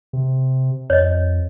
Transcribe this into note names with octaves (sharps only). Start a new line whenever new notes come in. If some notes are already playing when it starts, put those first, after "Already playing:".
C3
F2 C#5 D#5